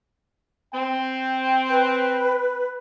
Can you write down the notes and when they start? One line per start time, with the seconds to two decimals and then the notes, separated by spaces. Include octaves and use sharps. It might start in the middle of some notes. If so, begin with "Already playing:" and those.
0.74 C4 G5
1.70 B4